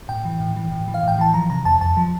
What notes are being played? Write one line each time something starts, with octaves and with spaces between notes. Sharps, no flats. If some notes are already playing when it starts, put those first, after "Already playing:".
A2 G5
E3
A2
E3
A2
E3
F5
A2 G5
E3 A5
F3 A#5
C3 A#5
F2 A5
F2 A5
F3